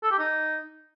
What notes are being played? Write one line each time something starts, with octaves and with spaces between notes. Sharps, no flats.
A4
G4
D#4